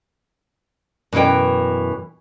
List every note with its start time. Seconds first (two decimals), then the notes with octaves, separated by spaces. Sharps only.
1.13 F#2 B2 E3 C#4 G5